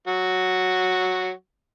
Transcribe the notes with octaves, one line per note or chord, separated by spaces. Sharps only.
F#3 F#4